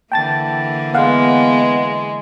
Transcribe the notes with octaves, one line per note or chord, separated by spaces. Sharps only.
D3 E3 A#3 G5 A5 A6
G#3 B3 F5 F#5